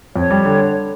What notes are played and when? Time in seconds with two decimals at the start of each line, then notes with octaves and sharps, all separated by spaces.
0.16 F2 C#5
0.31 G3
0.45 D3